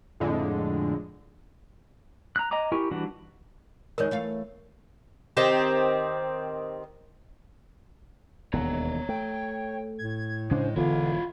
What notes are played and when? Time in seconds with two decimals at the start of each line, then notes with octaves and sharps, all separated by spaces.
0.20 F2 A2 D3 G#3
2.36 A#5 F#6
2.51 D#5 G#5 A#5 D6
2.72 E4 G4 A#4 G#5 C#6
2.91 E3 G3 D4 F#4
3.98 F2 D#3 G#3 A#4 C#5
4.11 E3 A3 F5
5.37 D#3 C4 G4
8.53 E1 D#2 B3 C#5 A#5
9.09 A3 G5
9.99 A2 G#6
10.51 C#3 G#3 D4 C5
10.76 E1 D3 E3 B3 E4 F4 F5